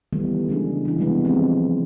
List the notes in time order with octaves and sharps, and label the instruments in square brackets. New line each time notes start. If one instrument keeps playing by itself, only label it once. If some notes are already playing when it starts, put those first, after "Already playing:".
[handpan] D#3 E3 G3 A3 B3
C#3 G#3 D4 G#4
E3 D4
C3 G3 G#3 B3
F3 G#3 C4